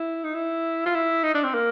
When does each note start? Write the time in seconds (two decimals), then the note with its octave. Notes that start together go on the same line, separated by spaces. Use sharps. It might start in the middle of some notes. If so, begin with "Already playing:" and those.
Already playing: E4
0.24 D#4
0.35 E4
0.86 F4
0.95 E4
1.24 D#4
1.35 D4
1.44 C4
1.54 A#3